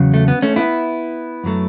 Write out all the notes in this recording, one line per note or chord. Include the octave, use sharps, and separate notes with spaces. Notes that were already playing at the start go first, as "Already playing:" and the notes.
Already playing: E2 C#3 F#3
A3
B3
A3 C#4
B3 E4
F#2 F#3 A3